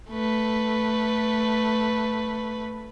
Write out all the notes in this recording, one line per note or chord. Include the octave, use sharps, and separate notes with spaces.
A3 B4